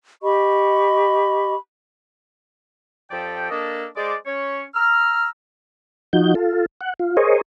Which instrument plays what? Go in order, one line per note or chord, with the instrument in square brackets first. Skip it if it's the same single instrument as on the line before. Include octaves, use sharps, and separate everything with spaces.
[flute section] G4 D#5 B5 C#6
[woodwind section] F2 F3 G4 A4 D5 G5
A#3 D4 A4 D#5
G#3 C5 D5
C#4 C#5
A#5 E6 F6
[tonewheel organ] F3 D#4 F#4 G6
F4 A4
F#5
F4
G#4 A#4 C5 C#5 D#5